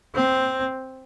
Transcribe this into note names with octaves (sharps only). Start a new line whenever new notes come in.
C4